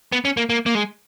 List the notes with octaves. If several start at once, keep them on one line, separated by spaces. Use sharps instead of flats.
B3
C#4
A#3
A#3
A#3
G#3